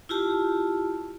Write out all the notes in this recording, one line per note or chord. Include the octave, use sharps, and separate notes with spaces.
E4 F4 G4 A5